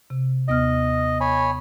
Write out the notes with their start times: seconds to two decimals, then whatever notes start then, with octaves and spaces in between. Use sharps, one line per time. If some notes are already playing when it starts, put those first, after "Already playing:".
0.10 C3
0.48 D#2 B3 D#5 F6
1.21 C#5 G#5 B5